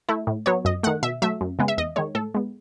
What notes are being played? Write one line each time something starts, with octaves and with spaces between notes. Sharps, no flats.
A3 E4
A2
F#3 B3 C#5
F#2 D#5
D#3 A3 F#5
B2 E5
F#3 A3 E5
F#2
C#3 G#3 B3
E5
E2 D#5
D#3 G#3 C#5
A2 A4
G#3 B3